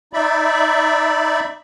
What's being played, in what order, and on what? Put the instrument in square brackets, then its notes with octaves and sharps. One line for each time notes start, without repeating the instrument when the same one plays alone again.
[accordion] D#4 D5 E5 B5